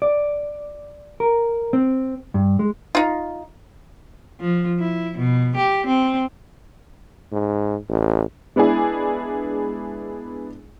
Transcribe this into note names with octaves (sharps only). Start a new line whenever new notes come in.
D5
A#4
C4
G2
G#3
D#4 F4
F3
E4
B2
G4
C4
G#2
A1
G#3 B3 D4 E4 G#4